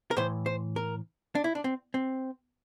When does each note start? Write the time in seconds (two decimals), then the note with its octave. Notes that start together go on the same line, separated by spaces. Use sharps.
0.11 A#4
0.17 A2 E3 C5
0.46 C5
0.76 A#4
1.35 D4
1.44 E4
1.55 D4
1.64 C4
1.94 C4